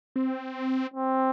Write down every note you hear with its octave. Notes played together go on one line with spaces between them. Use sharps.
C4
C4